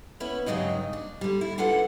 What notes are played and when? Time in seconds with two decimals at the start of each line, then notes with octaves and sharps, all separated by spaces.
0.20 B3 C#4 E4 B4
0.46 G2 C#3 F#3 G#3 D#4
0.93 D4
1.21 D3 G3
1.41 E4
1.58 D4 F4 A4 B4 F#5